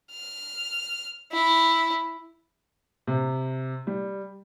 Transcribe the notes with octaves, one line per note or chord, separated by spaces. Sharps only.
F6
E4
C3
G3